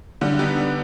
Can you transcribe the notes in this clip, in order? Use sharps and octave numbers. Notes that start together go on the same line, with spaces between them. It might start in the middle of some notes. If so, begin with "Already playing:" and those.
D3 G3
B3 D#4 G4 B4
G3